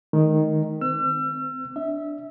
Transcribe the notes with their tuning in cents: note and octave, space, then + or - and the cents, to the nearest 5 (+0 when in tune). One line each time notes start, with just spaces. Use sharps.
D#3 +0 G#3 +45
C4 -35 E6 +40
D4 +0 E5 -20